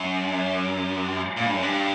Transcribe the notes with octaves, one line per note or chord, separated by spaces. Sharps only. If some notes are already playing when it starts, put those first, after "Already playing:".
Already playing: F#2
A#2
G2
F#2
G2